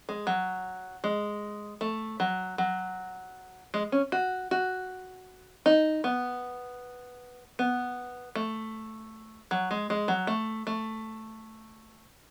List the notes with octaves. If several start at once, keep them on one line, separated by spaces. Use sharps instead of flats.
G#3
F#3
G#3
A3
F#3
F#3
G#3
C#4
F#4
F#4
D#4
B3
B3
A3
F#3
G#3
G#3
F#3
A3
A3